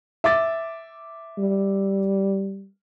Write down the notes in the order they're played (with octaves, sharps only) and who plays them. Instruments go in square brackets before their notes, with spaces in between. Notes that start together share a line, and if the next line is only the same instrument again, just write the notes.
[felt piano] E5 D6 A6
[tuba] G3